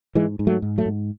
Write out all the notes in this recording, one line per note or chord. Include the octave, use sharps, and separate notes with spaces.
G#2 E3 G#3
G#2
F#3 A3
G#2
F#3 A3
G#2